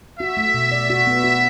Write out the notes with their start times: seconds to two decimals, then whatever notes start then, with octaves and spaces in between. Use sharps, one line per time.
0.20 F#4 E5
0.37 A3
0.54 B2
0.72 D5
0.90 F#4
1.07 B3
1.24 F#4